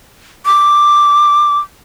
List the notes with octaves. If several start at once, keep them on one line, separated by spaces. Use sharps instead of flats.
D6